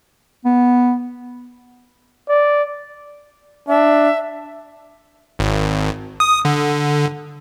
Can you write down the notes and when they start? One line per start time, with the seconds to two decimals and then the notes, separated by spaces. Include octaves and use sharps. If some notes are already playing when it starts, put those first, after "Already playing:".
0.45 B3
2.29 D5
3.68 D4 E5
5.39 G#1
6.20 D#6
6.45 D3